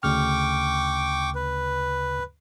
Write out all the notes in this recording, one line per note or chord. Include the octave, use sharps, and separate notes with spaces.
D2 C#3 G5 C#6 D6 F6
B4